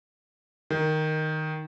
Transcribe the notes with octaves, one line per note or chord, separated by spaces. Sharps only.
D#3